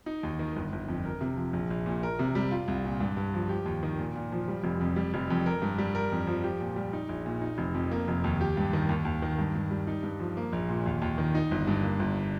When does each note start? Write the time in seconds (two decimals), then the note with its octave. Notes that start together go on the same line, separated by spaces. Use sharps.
0.06 D#4
0.23 D#2
0.39 D#3
0.56 G1
0.72 G1
0.88 F2
1.05 A#4
1.21 C3
1.37 F3
1.53 A#1
1.70 A#1
1.86 A#2
2.03 A#4
2.19 C3
2.35 G3
2.51 F4
2.68 C2
2.85 A#2
3.01 G2
3.17 G2
3.34 F3
3.49 G4
3.66 D#2
3.83 D#3
3.99 A#2
4.16 A#2
4.32 F3
4.48 G3
4.64 F1
4.80 F2
4.96 G3
5.14 F1
5.30 F2
5.46 A#4
5.62 G2
5.78 G3
5.95 A#4
6.12 F2
6.27 F3
6.44 G4
6.60 A#2
6.76 G3
6.93 D#4
7.09 A#1
7.26 A#2
7.42 D#4
7.58 F1
7.74 F2
7.91 A#3
8.08 F1
8.24 D#2
8.41 G4
8.57 G2
8.73 D#3
8.89 D#2
9.05 D#2
9.22 D#3
9.38 G2
9.55 G2
9.71 G3
9.87 D#4
10.03 G2
10.20 F3
10.37 A#3
10.53 A#1
10.69 A#2
10.86 D#2
11.02 D#2
11.18 D#3
11.35 D#4
11.51 G1
11.67 G2
11.83 A#3
12.00 G1